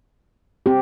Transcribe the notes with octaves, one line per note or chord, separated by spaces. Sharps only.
C4 G4